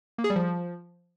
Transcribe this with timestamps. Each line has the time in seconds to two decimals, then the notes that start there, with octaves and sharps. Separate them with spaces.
0.18 A#3
0.24 G#4
0.30 G3
0.36 F3